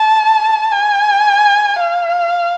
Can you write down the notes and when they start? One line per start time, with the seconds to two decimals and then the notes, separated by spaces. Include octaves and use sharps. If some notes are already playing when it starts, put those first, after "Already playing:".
Already playing: A5
0.72 G#5
1.80 F5